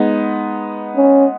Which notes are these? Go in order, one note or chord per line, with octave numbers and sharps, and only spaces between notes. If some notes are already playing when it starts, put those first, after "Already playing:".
Already playing: G#3 B3 D#4
C#4